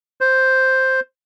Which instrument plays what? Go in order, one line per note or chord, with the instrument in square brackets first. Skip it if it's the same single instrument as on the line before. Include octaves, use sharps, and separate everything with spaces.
[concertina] C5